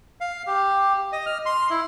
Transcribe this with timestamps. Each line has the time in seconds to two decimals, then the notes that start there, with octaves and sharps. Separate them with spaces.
0.21 F5
0.47 G4
1.13 D#5
1.26 F6
1.46 C6
1.70 E4